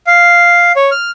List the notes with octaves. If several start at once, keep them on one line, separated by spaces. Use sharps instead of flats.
F5
C#5
F6